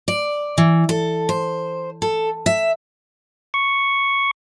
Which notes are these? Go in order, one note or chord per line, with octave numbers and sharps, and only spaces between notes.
D5
E3
A4
C5
A4
E5
C#6